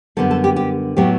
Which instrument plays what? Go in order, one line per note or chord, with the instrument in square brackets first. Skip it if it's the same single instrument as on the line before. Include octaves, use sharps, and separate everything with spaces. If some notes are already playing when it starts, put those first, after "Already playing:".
[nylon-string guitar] F#2 D3 G3 B3 A4
A4
G4
G4
A2 F#3 B3 G4